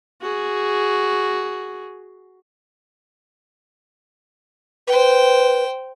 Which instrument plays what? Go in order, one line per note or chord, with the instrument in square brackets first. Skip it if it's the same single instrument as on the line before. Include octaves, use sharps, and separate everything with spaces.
[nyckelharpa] F#4 G#4
[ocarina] B4 [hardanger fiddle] C5 G5